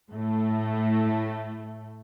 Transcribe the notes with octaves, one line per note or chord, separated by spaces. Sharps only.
A2 A3